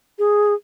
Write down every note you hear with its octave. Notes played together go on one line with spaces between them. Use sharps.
G#4